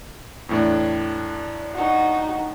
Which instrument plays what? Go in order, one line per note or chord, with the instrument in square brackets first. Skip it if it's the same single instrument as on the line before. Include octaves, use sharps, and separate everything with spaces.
[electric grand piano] E2 A2 D4
[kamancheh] D#4 F#4